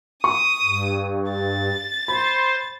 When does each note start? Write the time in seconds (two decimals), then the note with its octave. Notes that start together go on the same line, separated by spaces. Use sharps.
0.24 C#6 D#6
0.63 G2
1.32 A6
2.08 C5 B5